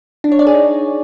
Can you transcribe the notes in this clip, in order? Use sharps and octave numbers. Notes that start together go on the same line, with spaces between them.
D4
C#5
D5
G#4
D#4